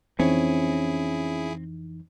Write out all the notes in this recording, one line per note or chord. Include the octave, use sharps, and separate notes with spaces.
F2 E3 C4 C#4 D#4 E4 G#4